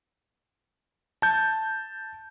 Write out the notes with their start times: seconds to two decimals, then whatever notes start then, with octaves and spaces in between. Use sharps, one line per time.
1.22 A5 G6